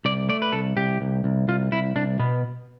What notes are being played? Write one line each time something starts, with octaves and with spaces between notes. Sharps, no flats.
C2 D5
A3 D5
B4
C2 A4
C2 G4
C2
C2
C2 F4
C2 E4
C2 D4
B2 B3